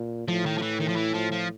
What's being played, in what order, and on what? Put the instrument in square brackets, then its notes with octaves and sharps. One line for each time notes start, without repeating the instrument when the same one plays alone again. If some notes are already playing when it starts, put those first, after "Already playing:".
Already playing: [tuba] A#2
[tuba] A2 [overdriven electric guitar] F3
[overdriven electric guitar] D#3
F3
E3
D#3
F3
E3
F3
F3